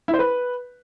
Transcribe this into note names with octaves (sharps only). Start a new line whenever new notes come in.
E4
C5
B4